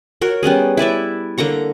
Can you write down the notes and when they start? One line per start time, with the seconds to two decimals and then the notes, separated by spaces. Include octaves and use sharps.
0.21 F#4 A#4 C#5
0.43 G3 B3 C#4 G#4
0.77 E4 B4 D5 E5
1.38 D3 A#3 A#5 C#6